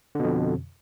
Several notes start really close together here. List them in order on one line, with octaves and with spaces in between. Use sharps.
D3 B2 F2